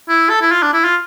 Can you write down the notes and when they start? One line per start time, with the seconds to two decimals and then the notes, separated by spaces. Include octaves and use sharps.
0.09 E4
0.30 A4
0.41 E4
0.51 F4
0.62 D4
0.73 E4
0.84 F4